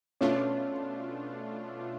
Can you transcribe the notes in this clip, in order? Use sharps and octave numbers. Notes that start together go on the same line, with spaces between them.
B2 A3 C#4 D4 F4